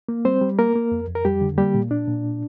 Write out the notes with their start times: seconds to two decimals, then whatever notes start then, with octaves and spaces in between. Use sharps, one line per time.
0.09 A#3
0.25 G3 C4 C5
0.41 G3
0.59 A#3 A#4
0.75 A#3
0.92 F2
1.08 F2
1.15 A#4
1.25 F2 G3 G4
1.41 D3
1.58 G3 A#3 G4
1.74 A#2
1.91 A#2 D4
2.08 A#2